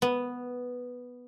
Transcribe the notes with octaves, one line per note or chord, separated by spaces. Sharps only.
B3